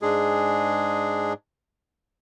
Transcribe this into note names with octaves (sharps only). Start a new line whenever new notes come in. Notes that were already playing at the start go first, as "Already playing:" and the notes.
G#2 G#3 D4 G#4